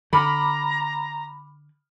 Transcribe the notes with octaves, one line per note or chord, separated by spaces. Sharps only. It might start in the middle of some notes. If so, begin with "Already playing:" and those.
D3 A#5 B5 D6 F6